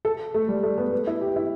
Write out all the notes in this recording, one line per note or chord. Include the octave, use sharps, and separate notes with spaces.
A4
A3
G3
A3
B3
B3
E4
G4
E4